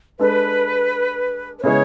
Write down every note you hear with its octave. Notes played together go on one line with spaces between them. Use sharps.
G#3 D4 A4 B4
B4
C#3 G#3 B3 E4 G#4 C#5